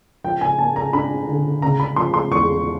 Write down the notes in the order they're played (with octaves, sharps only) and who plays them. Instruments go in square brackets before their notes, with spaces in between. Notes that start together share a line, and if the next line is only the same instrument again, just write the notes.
[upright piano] F3 G5
G#5
A#3 A5
A#5
D4 B5
D3
C#3 A#5
B5
F3 C6
C6
E2 C#6